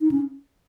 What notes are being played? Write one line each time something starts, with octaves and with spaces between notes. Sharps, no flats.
D#4
C#4